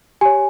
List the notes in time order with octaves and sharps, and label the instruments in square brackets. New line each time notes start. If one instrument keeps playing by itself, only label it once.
[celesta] G4 C#5 G#5